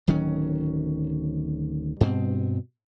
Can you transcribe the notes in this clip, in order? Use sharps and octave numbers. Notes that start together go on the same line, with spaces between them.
D1 D#3 F#3 C#4
G2 B2 C4